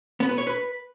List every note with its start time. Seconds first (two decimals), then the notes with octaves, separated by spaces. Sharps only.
0.20 B3
0.29 B4
0.38 C#5
0.47 B4